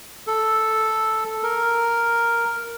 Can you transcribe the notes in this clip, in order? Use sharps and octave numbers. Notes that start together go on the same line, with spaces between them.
A4
A#4